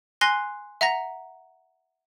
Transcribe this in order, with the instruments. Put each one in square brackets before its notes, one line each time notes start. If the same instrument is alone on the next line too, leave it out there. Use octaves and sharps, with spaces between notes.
[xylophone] G#5 C6 F#6 A#6 C7 G7
E5 F#5 A#5 A#6